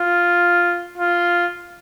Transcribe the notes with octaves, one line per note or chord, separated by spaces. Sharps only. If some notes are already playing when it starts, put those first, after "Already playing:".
Already playing: F4
F4